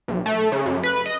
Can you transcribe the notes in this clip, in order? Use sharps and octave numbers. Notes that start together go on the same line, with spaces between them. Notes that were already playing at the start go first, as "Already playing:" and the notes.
B1
A3
C#3
F#2
B4
D#5